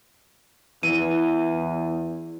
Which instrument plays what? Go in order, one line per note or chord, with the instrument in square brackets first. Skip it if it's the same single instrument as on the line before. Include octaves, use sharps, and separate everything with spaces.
[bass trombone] E2 [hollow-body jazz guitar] E3 [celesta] D#7